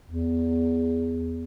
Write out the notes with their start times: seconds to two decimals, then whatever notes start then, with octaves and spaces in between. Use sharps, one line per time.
0.05 E2